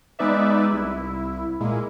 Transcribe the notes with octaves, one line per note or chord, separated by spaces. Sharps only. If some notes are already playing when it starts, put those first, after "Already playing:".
G#3 B3 D#4 B4 D5 E5
C2 E4
A#2 G#3 A#3 E4